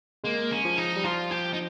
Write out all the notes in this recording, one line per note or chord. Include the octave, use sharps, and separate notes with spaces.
G#3 A#3
C#4
F3
D#4
G3
F3 F4
G4
D#4